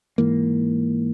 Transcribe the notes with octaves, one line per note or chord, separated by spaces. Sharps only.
G#2 E3 A#3